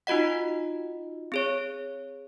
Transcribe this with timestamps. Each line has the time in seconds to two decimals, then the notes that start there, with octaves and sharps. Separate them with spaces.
0.07 D#4 F4 F#4 D#5 F#5
1.32 C4 G#4 C#5